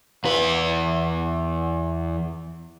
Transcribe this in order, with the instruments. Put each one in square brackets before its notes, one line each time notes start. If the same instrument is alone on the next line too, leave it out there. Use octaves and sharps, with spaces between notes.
[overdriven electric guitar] E2 B4